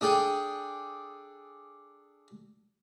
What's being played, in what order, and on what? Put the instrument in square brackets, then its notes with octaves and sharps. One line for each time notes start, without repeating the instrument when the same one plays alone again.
[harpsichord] D4 G#4 A4 G5